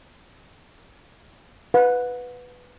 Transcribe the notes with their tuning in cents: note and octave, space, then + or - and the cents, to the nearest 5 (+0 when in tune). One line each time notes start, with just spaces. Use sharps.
B4 +5 F#5 -35